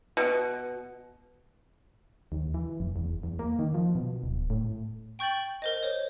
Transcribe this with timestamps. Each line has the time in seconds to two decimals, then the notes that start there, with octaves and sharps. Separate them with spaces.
0.17 B2
2.32 D#2
2.54 E3
2.80 F1
2.96 E2
3.23 E2
3.39 A#3
3.59 D#3
3.74 F3
3.95 B2
4.24 D1
4.50 A2
5.19 G5 C#6 G6 A6 F#7
5.62 A#4 C5 D#5
5.83 C5 C#5